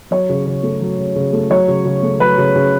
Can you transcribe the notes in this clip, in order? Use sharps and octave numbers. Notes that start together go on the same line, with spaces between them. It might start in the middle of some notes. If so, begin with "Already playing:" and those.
F#3 C#5
C#3
C#3
A3
F#3
C#3
C#3
A3
F#3 C#5
C#3
C#3
A3
F#3 B4
C#3
C#3